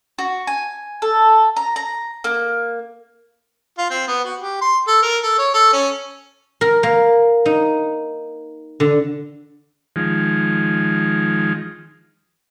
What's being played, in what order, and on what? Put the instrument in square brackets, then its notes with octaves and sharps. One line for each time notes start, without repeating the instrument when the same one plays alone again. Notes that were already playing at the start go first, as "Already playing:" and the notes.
[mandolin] F#4
G#5
A4
A#5
A#5
A#3
[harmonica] F4
C4
B3
F#4
G4
C6
A4
A#4
A4
C#5
A4
C#4
[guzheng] A#4
A#3
D#4
D3
[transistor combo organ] D#3 F3 G#3